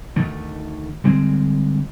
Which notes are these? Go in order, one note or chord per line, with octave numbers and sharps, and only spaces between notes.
D2 D#3 A3
D3 G3 G#3 C4